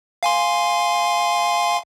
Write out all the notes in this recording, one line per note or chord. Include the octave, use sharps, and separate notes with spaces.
F5 G#5 C6